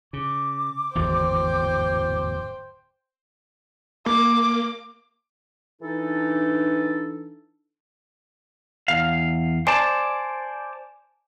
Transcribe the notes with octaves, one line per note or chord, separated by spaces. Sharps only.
C#3 D6
D1 G#1 E2 C5 G5
A#3 D6
E3 D4 D#4 A4
E2 F5
C5 D5 G#5 A5